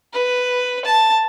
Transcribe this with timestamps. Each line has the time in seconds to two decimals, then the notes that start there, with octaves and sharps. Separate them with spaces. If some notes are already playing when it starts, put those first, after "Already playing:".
0.13 B4
0.85 A5